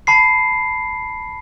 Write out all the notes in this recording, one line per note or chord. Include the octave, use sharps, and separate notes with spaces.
A5 B5 C7